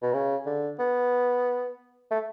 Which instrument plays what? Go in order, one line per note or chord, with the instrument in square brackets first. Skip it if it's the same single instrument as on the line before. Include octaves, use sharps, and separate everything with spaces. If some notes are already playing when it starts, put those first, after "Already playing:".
[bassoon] B2
C#3
D3
B3
A3